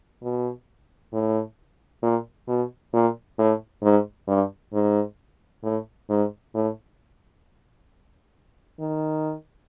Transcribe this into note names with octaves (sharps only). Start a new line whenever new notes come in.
B2
A2
A#2
B2
A#2
A2
G#2
G2
G#2
A2
G#2
A2
D#3